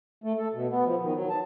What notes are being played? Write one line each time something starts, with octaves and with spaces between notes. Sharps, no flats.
A3
A4
B2
B3
F3
D#3
F#3
A5